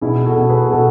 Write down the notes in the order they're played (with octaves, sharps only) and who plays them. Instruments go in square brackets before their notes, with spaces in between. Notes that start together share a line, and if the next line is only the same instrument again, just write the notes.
[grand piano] B2 E4 G#4
F#4 A4
B2
G#4 B4
B2 F#4 A4